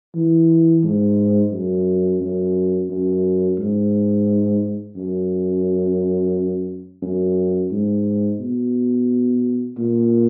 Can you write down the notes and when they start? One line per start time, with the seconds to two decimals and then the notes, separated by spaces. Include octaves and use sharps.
0.16 E3
0.84 G#2
1.53 F#2
2.21 F#2
2.90 F#2
3.59 G#2
4.97 F#2
7.02 F#2
7.72 G#2
8.40 B2
9.78 A#2